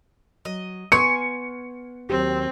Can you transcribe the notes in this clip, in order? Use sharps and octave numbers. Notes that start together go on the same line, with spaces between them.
F#3 D#5
B3 G#5 C6 C#6 C#7
D#2 F#3 C4 G4